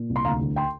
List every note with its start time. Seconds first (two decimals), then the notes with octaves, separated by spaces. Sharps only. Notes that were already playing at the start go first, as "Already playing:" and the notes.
Already playing: A#2
0.10 C2
0.16 C6
0.25 D2 F5 A#5
0.41 D2
0.56 G5 C6